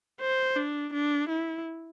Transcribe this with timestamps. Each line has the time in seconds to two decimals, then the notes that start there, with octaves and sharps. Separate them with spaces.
0.21 C5
0.56 D4
0.93 D4
1.29 E4